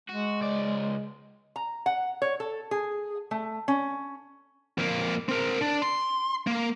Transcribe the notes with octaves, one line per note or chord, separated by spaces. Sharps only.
G#3 F#4
C#2 D5
A#5
F#5
C#5
A4
G#4
A3
C#4
F2 A#3
C4 A#4
D4
C6
A#3